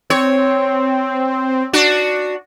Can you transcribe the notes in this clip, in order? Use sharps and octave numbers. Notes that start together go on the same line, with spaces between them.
C4 C#5
D4 F#4